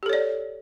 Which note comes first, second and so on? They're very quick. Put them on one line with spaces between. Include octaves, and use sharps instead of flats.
G4 A4 C#5 D5